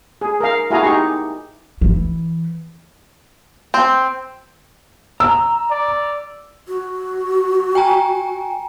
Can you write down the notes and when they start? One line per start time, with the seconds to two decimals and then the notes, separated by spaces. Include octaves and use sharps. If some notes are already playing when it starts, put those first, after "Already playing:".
0.21 G#4
0.41 A#4 F5
0.70 E4 F#4 G#4 F5 G#5 A#5
0.84 D#4 F#4 G4 C#6
1.81 E3
3.74 C4
5.20 A#5 E6
5.71 D5
6.68 F#4
7.75 G5 G#5 A#5